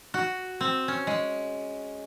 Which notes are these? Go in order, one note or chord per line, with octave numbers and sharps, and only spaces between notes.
F#4
C4
C#4
G#3